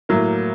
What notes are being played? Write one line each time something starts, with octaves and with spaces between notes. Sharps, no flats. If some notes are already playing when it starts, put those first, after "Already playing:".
A2 F#3 A#3